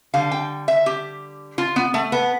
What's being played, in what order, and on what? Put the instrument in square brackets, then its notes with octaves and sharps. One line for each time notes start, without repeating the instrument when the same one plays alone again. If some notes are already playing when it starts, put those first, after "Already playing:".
[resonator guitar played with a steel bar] D3 G3 F5
G5
E5
G4
F4
B3
A3
B3